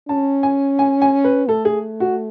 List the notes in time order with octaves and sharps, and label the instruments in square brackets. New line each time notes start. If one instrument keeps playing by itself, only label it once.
[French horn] C#4 [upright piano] A5
[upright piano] G#5
G#5
G#5
B4
[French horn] A3 [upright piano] A4
[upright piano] G#4
F#4